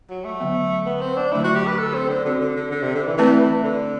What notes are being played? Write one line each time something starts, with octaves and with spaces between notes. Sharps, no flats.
F#3
A3
D3 F#3 B3
B3
C4
D4
D3 F#3 A3 D4 E4
F#4
G4
B4
A4
C4
D3
D3 C4 F#4 C5
D3
D3
D3
C3
D3
E3
E3 A3 C4 E4 B4 D5
E3
D3